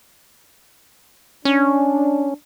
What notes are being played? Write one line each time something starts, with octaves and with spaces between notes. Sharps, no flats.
C#4 D4